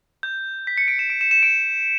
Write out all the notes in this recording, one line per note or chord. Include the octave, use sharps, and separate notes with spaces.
G6
B6
C#7
D7
E7
D7
E7
E7
D7